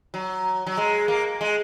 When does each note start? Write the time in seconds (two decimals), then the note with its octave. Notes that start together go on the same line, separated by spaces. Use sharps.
0.14 F#3
0.67 F#3
0.77 G#3
1.08 A#3
1.41 G#3